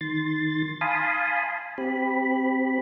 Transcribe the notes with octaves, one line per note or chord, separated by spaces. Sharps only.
D#3 C6 A6
F5 G#5 A5 B5 C6 D#6
C4 G4 B5